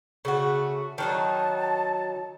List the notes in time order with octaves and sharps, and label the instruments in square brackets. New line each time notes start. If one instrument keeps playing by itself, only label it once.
[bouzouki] C#3 A3 F#4
[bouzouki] D#3 F#3 D#4 [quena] A5